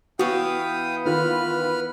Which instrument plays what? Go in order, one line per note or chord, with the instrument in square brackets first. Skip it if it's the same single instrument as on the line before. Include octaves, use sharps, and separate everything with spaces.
[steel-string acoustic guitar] E3 B3 [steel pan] F#4 [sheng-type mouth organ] F5 G5 D#6
[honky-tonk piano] D#3 F4 [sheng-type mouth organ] B4 F6